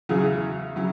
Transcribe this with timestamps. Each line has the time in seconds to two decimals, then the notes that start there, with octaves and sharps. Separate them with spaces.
0.09 E2 C#3 F#3 E4 G#4
0.76 C#3 F#3 E4